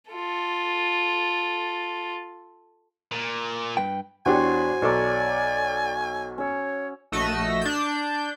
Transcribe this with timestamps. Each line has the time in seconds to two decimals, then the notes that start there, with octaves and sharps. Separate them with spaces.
0.11 F4 A4
3.12 A#2
3.77 G2 B4 G5
4.26 E2 D4 F#4 G4 C5 C#5 G#5
4.82 B1 A4 C#5 D5 A#5 D6
6.38 C#4 C#5 E6
7.12 A#1 A3 F#4 D#5 E6
7.62 D4 G6